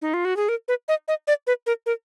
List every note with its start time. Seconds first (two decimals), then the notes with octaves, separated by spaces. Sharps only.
0.02 D#4
0.14 F4
0.25 F#4
0.36 G#4
0.49 A#4
0.68 B4
0.88 D#5
1.08 D#5
1.27 D5
1.47 B4
1.66 A#4
1.86 A#4